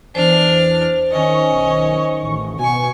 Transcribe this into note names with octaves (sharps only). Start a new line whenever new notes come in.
E2 E3 D4 C5 F6
D#3 C#4 D#5 C#6
B1
A1
B2 B3 G#5 C#6